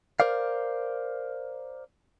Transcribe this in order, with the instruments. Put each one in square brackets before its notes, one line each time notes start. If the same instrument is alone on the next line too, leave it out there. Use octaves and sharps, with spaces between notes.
[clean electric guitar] A#4 C5 D5 F5